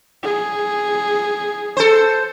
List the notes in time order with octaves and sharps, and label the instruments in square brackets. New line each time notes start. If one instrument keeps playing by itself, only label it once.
[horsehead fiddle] G#4
[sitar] A4 C5